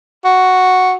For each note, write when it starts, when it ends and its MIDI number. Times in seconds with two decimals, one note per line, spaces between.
0.25 0.95 66